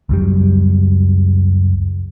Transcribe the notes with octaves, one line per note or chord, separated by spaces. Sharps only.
C#2 F#2 G3